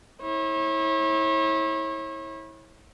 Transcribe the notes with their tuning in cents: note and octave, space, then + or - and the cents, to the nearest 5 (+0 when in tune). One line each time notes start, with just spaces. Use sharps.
E4 -30 C#5 -40